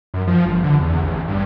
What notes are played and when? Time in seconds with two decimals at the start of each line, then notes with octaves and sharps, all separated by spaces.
0.14 F#2
0.27 F3
0.45 G1
0.64 D3
0.80 E2
1.02 A1
1.28 G2